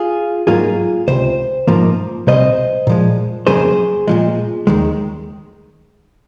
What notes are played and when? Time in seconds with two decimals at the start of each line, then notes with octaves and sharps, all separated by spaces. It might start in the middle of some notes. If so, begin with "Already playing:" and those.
Already playing: F4 G#4
0.47 G#2 F#3 A#3 F4 G#4
1.08 C#2 C3 C5
1.67 G#2 F3 A#3
2.27 C2 C3 C5 D#5
2.87 A#2 F3 G#3
3.47 F2 C#3 F#3 A#3 G#4 C5
4.08 A#2 F3 G#3
4.67 D#2 D#3 G#3